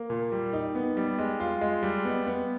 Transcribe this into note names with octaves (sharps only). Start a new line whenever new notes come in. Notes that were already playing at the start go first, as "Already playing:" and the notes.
Already playing: A#3
A#2
G3
D#4
B3
G3
G#3
F4
G#3
G3
B3
B3